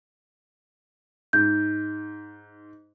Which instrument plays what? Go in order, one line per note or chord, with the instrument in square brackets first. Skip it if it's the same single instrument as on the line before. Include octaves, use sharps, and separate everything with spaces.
[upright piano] G#2 [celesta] G6